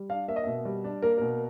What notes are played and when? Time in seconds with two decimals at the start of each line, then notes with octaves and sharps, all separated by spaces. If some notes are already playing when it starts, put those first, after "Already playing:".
Already playing: G3
0.09 D4 F5
0.28 A#3 E5
0.36 D#5
0.43 B2 E5
0.65 G3
0.84 D4
1.02 A#3 A#4
1.18 B2 A#4